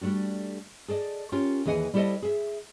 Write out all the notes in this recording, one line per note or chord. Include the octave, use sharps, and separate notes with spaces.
G3 A3 D4 F#4
G#4 A4 D5 D#5
C#4 F4 G4 A#4 C#5
D#2 E3 G#4 D#5 F#5 G#5
G3 E4 G4 A4 C5 D#5
G#4 E5